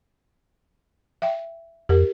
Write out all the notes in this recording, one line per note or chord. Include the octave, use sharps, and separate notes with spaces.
E5 G5
F2 G4 A#4